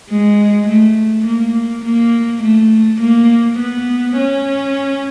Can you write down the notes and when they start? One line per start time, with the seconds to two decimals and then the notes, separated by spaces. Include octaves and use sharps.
0.10 G#3
0.68 A3
1.26 A#3
1.85 A#3
2.43 A3
3.01 A#3
3.59 B3
4.18 C#4